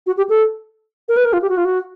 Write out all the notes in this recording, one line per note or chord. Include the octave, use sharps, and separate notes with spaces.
F#4
G4
A4
A#4
B4
A#4
F4
G4
F#4
F4
F#4